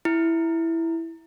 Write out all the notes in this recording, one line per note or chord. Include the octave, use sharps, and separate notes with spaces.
E4